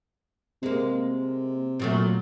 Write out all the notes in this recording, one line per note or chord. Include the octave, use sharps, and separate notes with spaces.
C3 G#3 A#3
A#2 F#3 A3